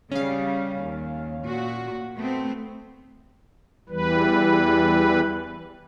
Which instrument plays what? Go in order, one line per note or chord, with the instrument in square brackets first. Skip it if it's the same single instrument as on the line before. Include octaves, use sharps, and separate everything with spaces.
[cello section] C#3 G3 [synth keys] C#4 F5
[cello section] D#2
A#2 F#4
A3 B3 C4
[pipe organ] E2 E3 G3 B4